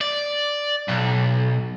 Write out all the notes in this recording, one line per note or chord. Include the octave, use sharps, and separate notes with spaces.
D5
B1